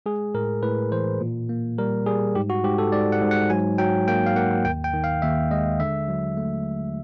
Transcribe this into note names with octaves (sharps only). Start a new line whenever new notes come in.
G#3 G#4
A2 A#4
A2 B4
E3 C5
A#2
A#3
G3 A#4
G3 G#4
G#2 G4
F#4
G#2 G4
A4
G#2 D5
F#5
G#2
F#5
F#3 G#5
F#3 G5
A#3 G5
F5
A#3 F#5
D#2 G5
G5
D#3
F5
D#2 E5
G#3 D#5
D3 E5
F#3
A3